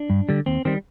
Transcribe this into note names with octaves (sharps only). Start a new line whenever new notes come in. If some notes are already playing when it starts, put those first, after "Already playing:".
Already playing: D4
G2
D3 G3
D#2 C4
D#3 G3 C4